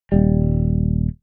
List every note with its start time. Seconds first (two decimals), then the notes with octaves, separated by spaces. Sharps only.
0.12 D#1 G3